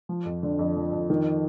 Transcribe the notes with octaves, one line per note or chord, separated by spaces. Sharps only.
F3
F2
D3
F2
F3
F2
D#3